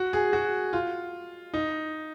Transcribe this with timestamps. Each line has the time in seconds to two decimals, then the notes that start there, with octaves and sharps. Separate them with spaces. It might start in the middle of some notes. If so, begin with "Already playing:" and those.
Already playing: F#4
0.13 G#4
0.33 F#4
0.73 F4
1.54 D#4